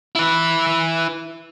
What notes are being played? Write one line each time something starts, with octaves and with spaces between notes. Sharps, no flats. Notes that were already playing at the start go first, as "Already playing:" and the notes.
E4 B4